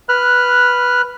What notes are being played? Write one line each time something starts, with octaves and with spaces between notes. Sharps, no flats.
B4 F6 F#6